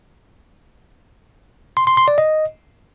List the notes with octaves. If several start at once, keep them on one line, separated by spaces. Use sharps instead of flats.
C6
C6
C6
D5
D#5